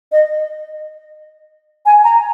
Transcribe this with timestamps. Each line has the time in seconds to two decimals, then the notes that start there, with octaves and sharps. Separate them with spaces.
0.12 D#5
1.86 G#5
2.04 A#5